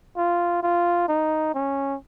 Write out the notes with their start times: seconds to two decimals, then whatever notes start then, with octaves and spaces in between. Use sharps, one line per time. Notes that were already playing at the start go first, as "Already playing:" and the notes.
0.17 F4
0.63 F4
1.09 D#4
1.54 C#4